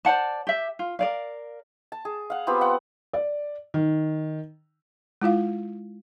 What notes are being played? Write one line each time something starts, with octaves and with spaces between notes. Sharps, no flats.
C5 D5 F#5 A5
G4 E5
F4
A#4 D5 F5
A5
G#4
F5 F#5
B3 C4 F4 G4
F#5
D5
D#3
G#3 E4 F4 F5